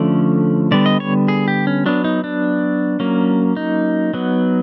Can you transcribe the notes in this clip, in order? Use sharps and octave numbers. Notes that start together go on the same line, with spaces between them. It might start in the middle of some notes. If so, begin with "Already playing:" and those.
Already playing: D3 F3 A3 C#4 D5
D3 G3 B3 D5
D#5
C#5
G#4
G4
C#4
F#3 B3 D4
D#4
D4
F#3 A#3 C#4
D#4
F#3 B3